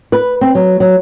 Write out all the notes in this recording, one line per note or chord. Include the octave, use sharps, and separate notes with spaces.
B4
C4
F#3
F#3